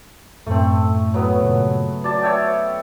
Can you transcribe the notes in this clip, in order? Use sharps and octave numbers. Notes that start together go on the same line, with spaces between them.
F#2 A2 A3 C4
F#3 B3
G2 A#2 C#3
F#4 D5 A5
C#5 E5 G5